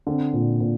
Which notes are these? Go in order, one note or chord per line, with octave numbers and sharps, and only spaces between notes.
D3 C4
A#2
A#2